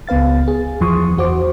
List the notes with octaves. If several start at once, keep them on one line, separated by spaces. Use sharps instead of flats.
C#2 B3 B4 F5 A6
G#4
E2 E3 F3 C6 C#6 D#6
E2 F#4 C5 D6